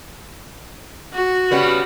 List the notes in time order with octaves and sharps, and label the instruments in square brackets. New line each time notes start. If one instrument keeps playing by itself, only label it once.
[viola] F#4
[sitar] C#3 G3 B3